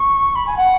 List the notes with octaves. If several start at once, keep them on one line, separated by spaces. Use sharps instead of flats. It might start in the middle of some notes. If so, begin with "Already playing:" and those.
Already playing: C#6
B5
G#5
F#5